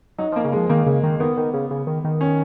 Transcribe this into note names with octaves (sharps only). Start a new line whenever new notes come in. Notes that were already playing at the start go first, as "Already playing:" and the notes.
F#3 D#4
F3
A#3
C#3
F3 G#3
D#3 A#3
C#3
D#3
D#3 B3
D#3
C#3
C#3
D#3
D#3
C#4